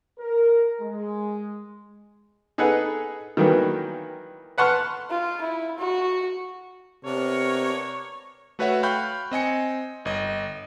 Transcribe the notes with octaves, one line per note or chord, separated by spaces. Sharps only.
A#4
G#3
D#4 G#4 A4 B4 F#5 G#5
D#3 E3 F#3 G3 A#3 B3
B4 F#5 A5 C6 C#6 F6
F4
E4
F#4
C3 B3 D4 A#4 C#5
A3 F#4 B4 C#5 E5 F#5
F5 G5 B5 C#6 F#6 G6
C4 D#5 G#5 C#7
G1 D#5